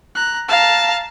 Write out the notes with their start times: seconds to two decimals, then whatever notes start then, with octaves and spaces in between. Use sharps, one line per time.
0.15 A#5 F#6
0.49 F5 A5 A#5